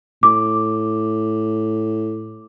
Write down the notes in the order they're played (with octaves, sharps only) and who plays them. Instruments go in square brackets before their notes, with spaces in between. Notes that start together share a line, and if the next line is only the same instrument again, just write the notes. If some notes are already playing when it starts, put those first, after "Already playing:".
[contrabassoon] A2 [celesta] D6